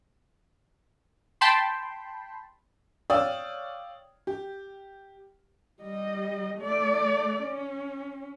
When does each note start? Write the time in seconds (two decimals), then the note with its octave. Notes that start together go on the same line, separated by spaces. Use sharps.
1.41 G5 A5 B5 C6
3.10 C#5 D5 F5 G5 D#6 E6
4.27 G4
5.82 G3 D#5
6.58 A3 D5
7.42 C#4